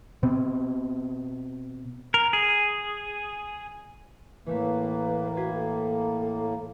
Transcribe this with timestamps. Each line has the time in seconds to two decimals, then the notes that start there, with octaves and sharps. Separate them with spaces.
0.23 B2 B3 C4
2.14 A#4
2.33 G#4
4.46 A2 E3 A3 A#3 B4 B6
5.37 F#4 B4 C5 G#6
5.54 A4